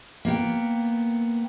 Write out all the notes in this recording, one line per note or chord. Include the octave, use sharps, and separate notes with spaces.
A#3 B3 G5